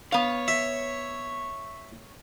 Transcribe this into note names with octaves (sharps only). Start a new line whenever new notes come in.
B3 C#5 F5
E5